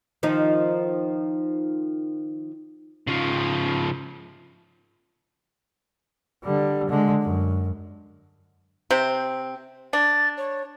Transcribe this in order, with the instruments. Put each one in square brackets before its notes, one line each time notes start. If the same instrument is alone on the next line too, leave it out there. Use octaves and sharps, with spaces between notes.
[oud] D#3 F3 D#4
[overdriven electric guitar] C#3 F3
[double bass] D3 G3
D3 G#3
F#2
[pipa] C3 C4
[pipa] D4 [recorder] A6
[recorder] C#5